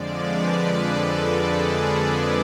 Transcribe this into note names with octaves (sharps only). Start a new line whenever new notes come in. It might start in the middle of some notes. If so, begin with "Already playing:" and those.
Already playing: F2 D3 F3 G#3 D5
B4
A4
G#4